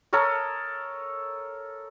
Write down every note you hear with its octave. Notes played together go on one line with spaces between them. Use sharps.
A4 A#4 C#5 D#5